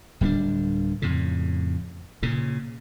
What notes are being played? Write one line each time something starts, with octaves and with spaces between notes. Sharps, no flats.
D1 G3 A#3 D4
F2 A2 C#3
A#2 C#3